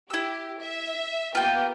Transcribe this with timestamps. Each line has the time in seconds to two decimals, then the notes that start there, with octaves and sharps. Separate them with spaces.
0.10 E4 G4 E6
0.61 E5
1.35 A#3 B3 F4 G4 G5